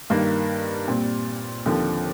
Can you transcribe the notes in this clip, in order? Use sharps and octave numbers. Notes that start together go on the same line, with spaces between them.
G2 D#3 A#3
A#2 G3 C4
D#2 D3 F3 C4